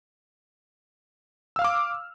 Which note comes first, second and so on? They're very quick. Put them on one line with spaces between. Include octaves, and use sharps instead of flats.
E6 F5 F6 D6